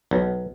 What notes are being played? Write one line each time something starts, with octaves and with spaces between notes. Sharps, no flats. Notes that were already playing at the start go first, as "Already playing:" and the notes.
B1